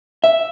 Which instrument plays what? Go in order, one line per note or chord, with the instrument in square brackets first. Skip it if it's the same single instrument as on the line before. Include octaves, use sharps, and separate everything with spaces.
[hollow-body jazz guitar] E5